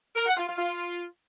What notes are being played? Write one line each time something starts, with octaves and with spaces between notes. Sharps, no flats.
A#4
F#5
F4
F4
F4